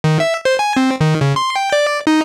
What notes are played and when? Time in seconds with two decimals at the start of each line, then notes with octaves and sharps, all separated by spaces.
0.04 D#3
0.20 E5
0.45 C5
0.59 G#5
0.77 C4
1.01 D#3
1.21 C#3
1.36 C6
1.56 G5
1.72 D5
2.07 D#4